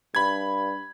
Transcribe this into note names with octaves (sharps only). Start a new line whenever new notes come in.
G2 B5 G#6